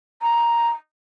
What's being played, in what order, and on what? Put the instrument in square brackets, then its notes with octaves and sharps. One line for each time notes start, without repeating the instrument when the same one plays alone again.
[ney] A#5